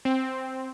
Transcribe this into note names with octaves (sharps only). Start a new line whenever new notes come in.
C4